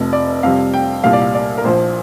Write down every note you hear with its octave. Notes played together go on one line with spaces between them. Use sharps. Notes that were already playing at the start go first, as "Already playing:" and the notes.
Already playing: F1 F2 C3
D5
F2 C3 G3 F5
G5
C2 A#2 G3 F5
D5
F5
D5
A#4
A#1 A#2 F3 C5